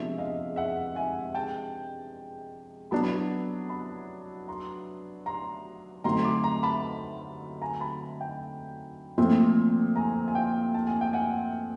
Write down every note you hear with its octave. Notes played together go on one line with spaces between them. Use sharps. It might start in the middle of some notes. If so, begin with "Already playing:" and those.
Already playing: C3 F3 G#3 B3 D4 E5
D#5 F5
E5 F#5
F#5 G#5
G5 A5
F#3 B3 D4 A5 B5
A5 B5
A#5 C6
A#5 C6
D3 F#3 A3 C4 D#4 A#5 C6
C6 D6
A#5 C6
A5 B5
G#5 A#5
A5 B5
G5 A5
A#2 F3 A3 C4
G#5 A#5
G#5
F5 G5
A5
G#5
G5
F#5 G#5